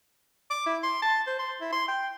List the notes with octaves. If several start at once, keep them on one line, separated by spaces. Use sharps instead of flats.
D6
E4
C6
A5
C5
C6
E4
C6
G5